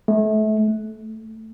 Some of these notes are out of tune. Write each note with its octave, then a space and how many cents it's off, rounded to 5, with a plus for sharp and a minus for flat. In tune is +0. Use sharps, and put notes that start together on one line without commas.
A3 -30
A3 +10